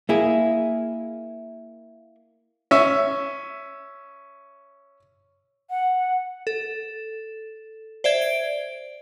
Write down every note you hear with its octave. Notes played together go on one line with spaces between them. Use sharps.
A#3 E4 G#4
C#4 E5
F#5
A4
C5 D5 E5 G#6
D7